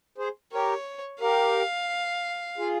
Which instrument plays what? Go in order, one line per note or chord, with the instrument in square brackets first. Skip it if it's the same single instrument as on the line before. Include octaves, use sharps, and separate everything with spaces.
[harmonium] G#4 C5
[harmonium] G4 A#4 [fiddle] C#5
[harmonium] G4 A#4 [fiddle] F5
[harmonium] F4 G#4